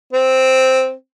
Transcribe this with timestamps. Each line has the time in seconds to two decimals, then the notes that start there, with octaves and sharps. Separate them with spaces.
0.13 C4